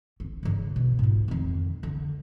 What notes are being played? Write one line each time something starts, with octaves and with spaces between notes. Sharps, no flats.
C#4
G2 C#3
B2
G#2 F4
F2 D#3
D3